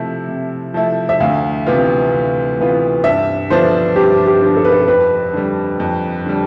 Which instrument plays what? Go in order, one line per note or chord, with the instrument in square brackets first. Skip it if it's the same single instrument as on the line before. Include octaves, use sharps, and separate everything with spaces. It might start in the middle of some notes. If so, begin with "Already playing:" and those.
Already playing: [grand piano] C3 F3 A3 E4 [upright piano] E5
[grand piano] C3
F3 A3 E4
[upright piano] E5
[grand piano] D2 [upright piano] F5
[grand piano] C3 E3 B3 F4
D2
C3 E3 B3 F4
[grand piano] G2 [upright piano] E5
[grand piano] D3 F3 B3 D4 [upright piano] C5
[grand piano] G2 [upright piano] G4
[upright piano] G4
[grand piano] D3 F3 B3 D4
[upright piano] A4
B4
A4
[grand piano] F2 [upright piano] B4
[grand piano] D3 G3
F2
D3 G3